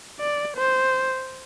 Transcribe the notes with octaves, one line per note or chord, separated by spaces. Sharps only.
D5
C5